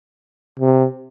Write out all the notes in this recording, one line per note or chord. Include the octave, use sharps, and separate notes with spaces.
C3